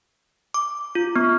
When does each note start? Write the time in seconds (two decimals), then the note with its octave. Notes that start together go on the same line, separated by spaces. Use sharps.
0.54 D6
0.95 F4
1.16 B3